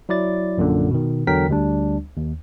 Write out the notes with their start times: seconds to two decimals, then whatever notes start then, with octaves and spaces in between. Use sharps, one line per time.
0.09 F#3 E4 D5 A6
0.57 A#1 F#2 A#2 D3
0.91 B2 D#3
1.27 E2 D3 F#3 A#4 G5 B6
1.49 D2 G3 D4
2.17 D#2